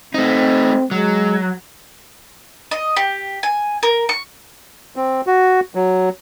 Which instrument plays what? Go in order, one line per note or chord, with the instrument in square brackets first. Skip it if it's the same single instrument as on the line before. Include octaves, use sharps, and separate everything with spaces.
[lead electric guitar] A3 D#4 [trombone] C4
[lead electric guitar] F#3 [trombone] G#3
[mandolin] D#5
G4
G#5
A#4
C#6
[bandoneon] C4
F#4
F#3